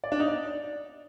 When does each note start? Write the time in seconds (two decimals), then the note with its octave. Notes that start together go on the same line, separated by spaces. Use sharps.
0.04 D5
0.12 D4
0.20 D#4
0.28 D5